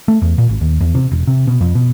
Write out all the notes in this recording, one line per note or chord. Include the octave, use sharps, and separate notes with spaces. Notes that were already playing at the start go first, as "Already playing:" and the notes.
A3
E2
A#2
G#1
D#2
E2
C3
E1
C3
B2
F2
B2